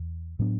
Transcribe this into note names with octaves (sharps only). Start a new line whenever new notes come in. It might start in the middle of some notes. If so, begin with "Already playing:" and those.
Already playing: E2
A2 F#3 B3 D4